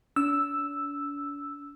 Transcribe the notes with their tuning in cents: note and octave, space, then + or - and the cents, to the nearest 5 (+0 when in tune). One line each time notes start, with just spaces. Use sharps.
D4 -45 E6 +0